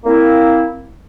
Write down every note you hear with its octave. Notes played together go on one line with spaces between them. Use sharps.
A#3 C4 E4